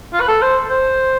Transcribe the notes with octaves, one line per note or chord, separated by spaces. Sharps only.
F4
B4
A4
C5
C5